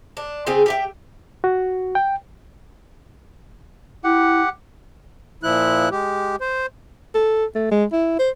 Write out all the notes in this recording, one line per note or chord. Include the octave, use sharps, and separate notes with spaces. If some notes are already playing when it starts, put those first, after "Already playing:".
D4
C#3 C4 G4 G#4
G4 E5 G5
F#4
G5
E4 G4 F#5
A#2 F3 E4 F#6
G#3 G4
C5
A4
A3
G#3
E4
C5